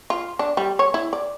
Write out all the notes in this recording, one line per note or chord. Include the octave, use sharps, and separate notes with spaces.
F4
D4
G3
C#5
E4
D5